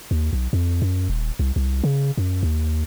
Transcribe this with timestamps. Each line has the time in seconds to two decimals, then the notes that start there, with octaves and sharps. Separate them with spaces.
0.11 D#2
0.33 B1
0.53 F2
0.82 F#2
1.09 D#1
1.39 C2
1.56 C2
1.84 C#3
2.18 F#2
2.43 D#2